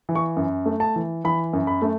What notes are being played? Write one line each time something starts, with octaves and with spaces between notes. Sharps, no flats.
E3
C#6
F#2
A3
A5
E3
E3 B5
F#2
B5
A3